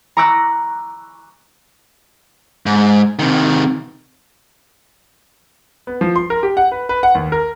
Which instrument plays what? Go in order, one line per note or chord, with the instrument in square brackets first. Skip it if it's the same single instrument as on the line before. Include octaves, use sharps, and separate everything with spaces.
[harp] A#5 C#6 D6 E6 F#6 A#6
[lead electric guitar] G#2
C3 D#3
[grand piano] B3
F3
C6
A#4
G4
F#5
B4
B4
F#5
D#2
A#4